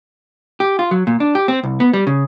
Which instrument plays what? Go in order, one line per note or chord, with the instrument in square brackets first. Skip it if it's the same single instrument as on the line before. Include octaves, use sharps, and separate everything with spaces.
[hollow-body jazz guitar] G4
F4
F#3
A#2
D4
G4
C4
C2
B3
G3
C#3